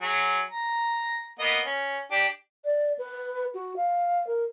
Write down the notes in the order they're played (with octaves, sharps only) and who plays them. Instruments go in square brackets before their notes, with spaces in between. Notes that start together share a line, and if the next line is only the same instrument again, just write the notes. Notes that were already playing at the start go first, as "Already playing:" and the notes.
[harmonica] F#3 G#4
A#5
A#3 B3 D#5
C#4
D4 G4
[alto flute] D5
B4
F#4
F5
A#4